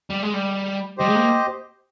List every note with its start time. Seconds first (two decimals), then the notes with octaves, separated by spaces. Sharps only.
0.10 G3
0.23 G#3
0.34 G3
0.98 G3 G4 C5 D#5
1.08 G#3
1.15 A#3